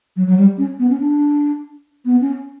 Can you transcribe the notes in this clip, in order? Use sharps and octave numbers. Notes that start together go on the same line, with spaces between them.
F#3
F#3
G3
C#4
B3
C#4
D4
B3
C#4